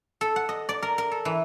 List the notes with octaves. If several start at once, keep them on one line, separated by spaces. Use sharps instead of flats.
A4
F#5
D#5
D5
A#4
A#4
A4
E3